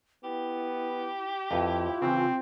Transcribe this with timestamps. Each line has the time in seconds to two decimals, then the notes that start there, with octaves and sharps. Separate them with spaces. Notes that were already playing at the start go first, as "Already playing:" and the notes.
0.24 B3 E4 G4
1.51 F2 E4 F4 B4 A#5
2.02 C#3 E3 C4